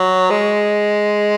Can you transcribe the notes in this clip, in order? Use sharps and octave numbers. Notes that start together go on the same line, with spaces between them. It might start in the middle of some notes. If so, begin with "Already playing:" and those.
Already playing: F#3
G#3